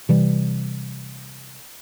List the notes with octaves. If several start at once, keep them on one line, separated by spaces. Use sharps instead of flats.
C3 E3 G3